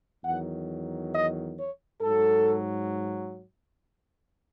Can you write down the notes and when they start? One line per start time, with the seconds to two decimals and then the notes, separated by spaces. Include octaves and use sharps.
0.24 E2 D#3 F#3 F#5
1.13 D#5
1.57 C#5
2.01 G#2 F#3 A4